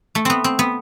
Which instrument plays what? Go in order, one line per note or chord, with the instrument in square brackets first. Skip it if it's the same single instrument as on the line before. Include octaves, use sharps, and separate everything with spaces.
[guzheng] A3
B3 C4
C4
B3